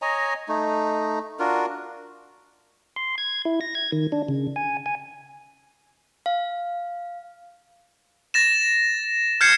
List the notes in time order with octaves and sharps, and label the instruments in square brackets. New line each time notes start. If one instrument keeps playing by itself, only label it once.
[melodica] C#5 D#5 G#5 A#5
A3 D#4
D4 F4 F#4 A#4
[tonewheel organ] C6
G#6
E4
A#6
G#6
D#3
D4
C#3
G#5
G#5
[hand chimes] F5
[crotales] A6 A#6 E7
F6 G6 G#6 C7 C#7 E7